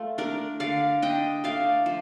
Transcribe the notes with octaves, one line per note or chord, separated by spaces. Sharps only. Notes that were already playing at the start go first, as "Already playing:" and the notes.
Already playing: A3 F4
D4 A#4 D5
D3 D5 F5
D4 D#5 G5
A3 D5 F5
F3